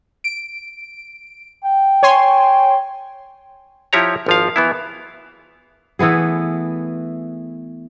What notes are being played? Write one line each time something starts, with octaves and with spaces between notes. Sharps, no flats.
D7
G5
C#5 G#5 C6
F3 E4 G4 C#5 A#5
G#1 F3 F5
E3 B3 E4
E3 A3 B3 G#4